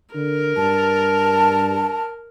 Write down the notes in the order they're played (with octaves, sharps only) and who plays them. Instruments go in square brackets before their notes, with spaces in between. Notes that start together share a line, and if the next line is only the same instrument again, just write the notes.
[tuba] D3 [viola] A#4
[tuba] G2 [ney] A5